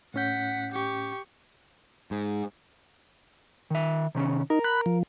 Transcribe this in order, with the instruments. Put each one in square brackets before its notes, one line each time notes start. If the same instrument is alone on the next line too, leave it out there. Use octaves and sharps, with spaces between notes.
[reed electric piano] A2 C#4 G6 [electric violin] F#5 B6
[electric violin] G4 C#6
[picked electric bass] G#2
[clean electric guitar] D#3 E5
C3 D#3 C#4
[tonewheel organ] D#4 [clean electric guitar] A#4
[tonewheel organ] B5 F#6
F3